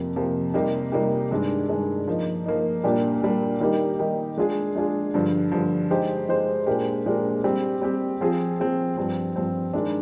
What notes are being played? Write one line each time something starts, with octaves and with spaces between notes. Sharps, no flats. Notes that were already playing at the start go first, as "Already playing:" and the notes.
Already playing: F2 C3 F3 A#3
F2 C3 F3 A#3
C3 G3 A#3 D#4 G4
C3 G3 A#3 D#4 G4
G2 D#3 G#3 D4
G2 D#3 G#3 D4
F3 A#3 D#4
F3 A#3 D#4
A#2 G3 A#3 D4 G4
A#2 G3 A#3 D4 G4
D#3 G3 A#3 D#4 G4
D#3 G3 A#3 D#4 G4
G#3 D4 F4 G#4
G#3 D4 F4 G#4
G2 D3 F3
G2 D3 F3
G#3 D#4 G4 C5
G#3 D#4 G4 C5
A#2 G#3 D4 G4 A#4
A#2 G#3 D4 G4 A#4
G3 C4 G4
G3 C4 G4
F3 C4 F4 G#4
F3 C4 F4 G#4
G2 F3 C4
G2 F3 C4
D#3 G#3 D4